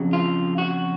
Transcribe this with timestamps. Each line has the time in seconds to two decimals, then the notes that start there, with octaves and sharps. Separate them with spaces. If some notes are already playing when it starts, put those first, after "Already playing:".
Already playing: F2 C#3 F#3
0.13 F4
0.58 F#4